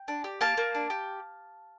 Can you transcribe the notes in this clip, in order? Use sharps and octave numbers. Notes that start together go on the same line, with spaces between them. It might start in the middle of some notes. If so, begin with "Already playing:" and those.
Already playing: G5
D4
G4
A#3 F5 A5
A#3
D4
G4